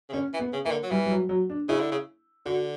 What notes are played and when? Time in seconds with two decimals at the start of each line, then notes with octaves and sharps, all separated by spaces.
0.09 C#3
0.13 D3 C#4
0.33 E3
0.40 B3
0.53 C#3
0.65 E3 A#3
0.71 D3
0.83 F#3
0.91 E3 G3
1.06 G3
1.11 F#3
1.29 F#3
1.50 D4
1.69 C#3 E4
1.80 D3
1.91 C#3
2.46 D3 F#4